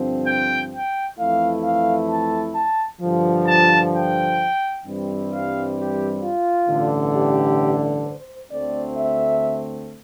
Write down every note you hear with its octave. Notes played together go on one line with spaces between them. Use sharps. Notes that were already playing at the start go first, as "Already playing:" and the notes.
Already playing: G2 D3 F3 C4
G5
G5
F2 E3 A3 E4 F5
F5
A5
A5
G2 D3 F3
A5
G5
G2 E3 G3 C4
F5
G4
F4
A1 G2 D3
G4
C5
D2 D3 A3 C4 D5
E5